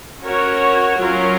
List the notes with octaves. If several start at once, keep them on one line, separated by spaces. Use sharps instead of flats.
C#4 F#4 A#4 C#5
F#3 C#4 F4 A#4